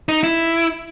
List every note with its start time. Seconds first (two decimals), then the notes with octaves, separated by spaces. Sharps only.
0.09 D#4
0.23 E4